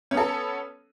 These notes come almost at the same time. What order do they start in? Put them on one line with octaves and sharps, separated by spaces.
C#4 B3 A4